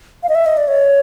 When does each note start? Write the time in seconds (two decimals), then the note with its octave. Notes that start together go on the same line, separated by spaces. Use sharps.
0.23 F5
0.29 D#5
0.35 E5
0.46 D#5
0.57 D5
0.68 C#5